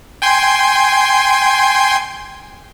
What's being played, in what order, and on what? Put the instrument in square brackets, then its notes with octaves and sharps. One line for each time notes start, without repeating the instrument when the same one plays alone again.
[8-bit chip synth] G5 G#5 C6